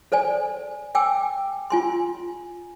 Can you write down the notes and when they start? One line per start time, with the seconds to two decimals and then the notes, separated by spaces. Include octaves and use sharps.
0.12 A4 C5 D5 G#5
0.95 G5 G#5 D6 E6
1.70 F4 G#5 C6